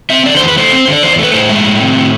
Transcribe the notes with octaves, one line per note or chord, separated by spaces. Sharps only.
C4 E5
D3 D5
E2 C5
B4
A3 C5
C4
D3 D5
E2 C5
D5
A3
B4
A2 C5
G#3 E5
A2
C4
A2